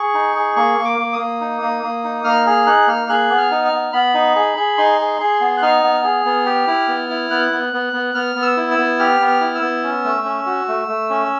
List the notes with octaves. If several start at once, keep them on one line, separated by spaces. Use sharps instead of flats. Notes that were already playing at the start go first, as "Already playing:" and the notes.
Already playing: G#4 C#6
D#4
G#4
A#3 C#6
A#3
D6
A#3
D#6
A#3
D#4
A#3
A#3
D#4
A#3 F6
G#4 F6
D#4 F#6
A#3 F6
G#4 F#6
B3
F6
D#4
F6
B3
B3 B5
D#4
G#4
G#4
D#4 C6
G#4
G#4
B3
F#6
D#4 F6
B3
G#4
B3
G4
E4
B3
E4
B3 F#6
B3
B3
B3
B3 F6
B3
E6
E4
E6
B3
G4 F6
B3
F6
E4
E6
B3
C#4
A3
C#4
F#4
A3
A3
C#4